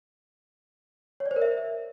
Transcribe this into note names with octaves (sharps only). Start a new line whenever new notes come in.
C#5
D5
C5
A#4
E5